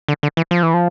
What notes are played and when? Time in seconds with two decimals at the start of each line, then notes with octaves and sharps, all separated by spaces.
0.08 D3
0.23 D3
0.37 E3
0.51 F3
0.63 E3
0.74 F3